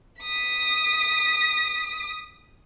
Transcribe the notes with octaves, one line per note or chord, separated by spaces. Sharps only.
D#6 B6